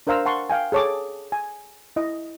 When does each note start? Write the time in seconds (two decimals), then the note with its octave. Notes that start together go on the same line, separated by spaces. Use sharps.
0.07 D4 A#4 C5 F5 A#5 E6
0.26 F#5 A5 C6 C#6
0.50 F5 G5 G#5
0.72 G#4 A4 C#5 A5 D6
1.32 G#5
1.96 E4 D#5